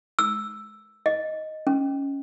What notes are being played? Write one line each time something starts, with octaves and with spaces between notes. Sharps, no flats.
E6
D#5
C#4